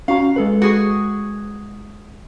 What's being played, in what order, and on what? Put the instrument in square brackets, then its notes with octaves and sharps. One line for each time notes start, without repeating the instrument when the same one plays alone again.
[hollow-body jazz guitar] C#4 F#4 A#5 [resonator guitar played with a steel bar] F5
[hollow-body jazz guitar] G#3 A4 B4
[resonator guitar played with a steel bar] F#4 G#4